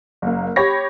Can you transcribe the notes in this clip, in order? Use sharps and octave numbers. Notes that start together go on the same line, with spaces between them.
F#1 A#3
G4 C#5 B5 A#6